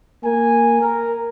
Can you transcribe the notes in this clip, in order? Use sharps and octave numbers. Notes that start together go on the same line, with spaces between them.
A#3 A#4 G#5
A#4